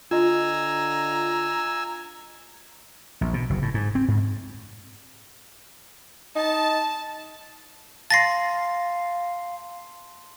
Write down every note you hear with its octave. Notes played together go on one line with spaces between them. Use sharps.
D3 F4 D#5 G#5 A#5 E6
A#1
B2
F#1
A2
G#2
C4
G#2
D#4 A5
F5 A5 C6 A6 A#6 C7